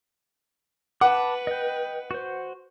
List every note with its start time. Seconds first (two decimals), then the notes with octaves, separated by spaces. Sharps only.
1.01 B4 F#5 A5 B5 D6
1.47 D#5 G5
2.11 F#4 C5